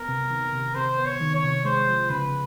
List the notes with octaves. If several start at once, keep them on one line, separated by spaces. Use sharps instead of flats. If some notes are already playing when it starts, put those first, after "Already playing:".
Already playing: B3 A#4
C3
D#3
C3
C3 C5
B3
C#5
D#3
C#5
C3
G#3 C5
F3
C#3 B4